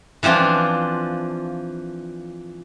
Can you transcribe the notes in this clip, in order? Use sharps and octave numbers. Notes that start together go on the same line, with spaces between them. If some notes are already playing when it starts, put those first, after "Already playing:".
E3 F3 C4 D4 F4